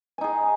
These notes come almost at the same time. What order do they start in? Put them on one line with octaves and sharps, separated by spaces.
G#5 D#4 G#4